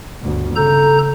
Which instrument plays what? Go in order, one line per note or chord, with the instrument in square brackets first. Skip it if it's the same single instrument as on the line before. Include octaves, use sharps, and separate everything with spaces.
[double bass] G1 D2
[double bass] C#3 [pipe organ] A4 A#5 G6